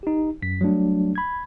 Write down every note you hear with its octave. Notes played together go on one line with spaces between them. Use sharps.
D#4 G4
F#2 B6
F#3 G3 A3 D4
B5 G#6